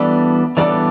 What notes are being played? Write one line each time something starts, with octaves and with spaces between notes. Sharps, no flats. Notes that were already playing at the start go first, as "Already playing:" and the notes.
Already playing: E3 G3 B3 D4 A4 D5
E3 G3 B3 D4 A4 D5